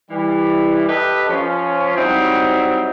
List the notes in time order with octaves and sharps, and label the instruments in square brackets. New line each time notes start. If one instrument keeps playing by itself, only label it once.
[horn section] E3 G3
G4 A4 B4 D#5
F3 C#4
F#3 G3 C4 D#4 E4